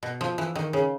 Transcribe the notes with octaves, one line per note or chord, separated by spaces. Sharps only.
B2
F3
E3
D#3
C#3